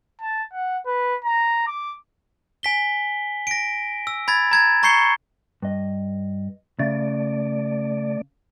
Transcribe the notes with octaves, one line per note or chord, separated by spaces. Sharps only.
A5
F#5
B4
A#5
D6
G#5 B6 G7
A#6 D7
E6
B5 G#6 A6
A#5 G#6 A6
A#5 C#6 G6 C7 C#7 G7
G2 D#5
C#3 A3 D5